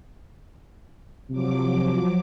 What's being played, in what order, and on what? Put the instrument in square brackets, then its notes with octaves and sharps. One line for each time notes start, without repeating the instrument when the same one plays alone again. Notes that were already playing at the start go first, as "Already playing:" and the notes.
[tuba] C3 [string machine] F3 F#3 D6